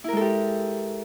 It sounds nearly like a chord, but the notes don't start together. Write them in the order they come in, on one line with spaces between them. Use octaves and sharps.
E4 A#4 G#3 A4 G4